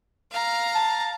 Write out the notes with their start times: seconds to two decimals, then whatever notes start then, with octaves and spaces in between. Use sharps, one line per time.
0.32 F5 A#5
0.75 A5